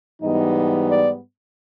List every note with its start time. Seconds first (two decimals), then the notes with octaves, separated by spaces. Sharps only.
0.22 G#2 E3 G3 B3 D#4 D#5
0.90 D5